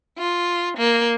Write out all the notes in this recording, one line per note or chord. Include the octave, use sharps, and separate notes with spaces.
F4
A#3